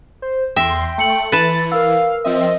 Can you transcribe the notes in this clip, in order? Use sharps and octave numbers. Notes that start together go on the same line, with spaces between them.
C5
E2 E5 G5 C6 A#6
A3 C6 C#7 F#7
E3 B4 A5 A6
A#4 F5 E6
F3 C4 D#5 E5